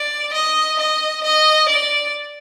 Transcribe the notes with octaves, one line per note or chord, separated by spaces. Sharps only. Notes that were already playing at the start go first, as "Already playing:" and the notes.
Already playing: D5
D#5
D#5
D#5
D5